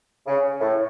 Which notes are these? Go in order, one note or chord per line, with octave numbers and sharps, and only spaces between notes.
C#3
A2